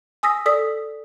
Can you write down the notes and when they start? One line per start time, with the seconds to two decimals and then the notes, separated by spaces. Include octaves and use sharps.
0.23 G#5 D#6 E6 A#6 B6
0.46 A4 D5 D#6 E6 B6